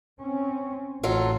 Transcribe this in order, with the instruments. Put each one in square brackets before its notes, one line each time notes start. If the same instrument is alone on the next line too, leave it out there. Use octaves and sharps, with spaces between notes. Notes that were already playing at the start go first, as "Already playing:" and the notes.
[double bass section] C4 C#4
[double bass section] A1 [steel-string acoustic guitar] F#3 F4 A4